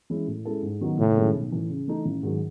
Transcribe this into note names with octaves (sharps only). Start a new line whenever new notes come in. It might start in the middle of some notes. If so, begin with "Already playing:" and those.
E3 G#3 C#4 E4
A2
G#3 C#4 E4 A4
G#2
D#3 F#3 B3 D#4
F#1 A2
F#2 D#3 G#3
B1
A2 E3
C#3
E3 A3 D#4
A1
G#2 D#3 F#3